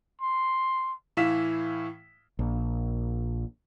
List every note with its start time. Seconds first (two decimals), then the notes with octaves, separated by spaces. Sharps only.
0.21 C6
1.17 A2 E3 E4 F5 B6 E7
2.39 A#1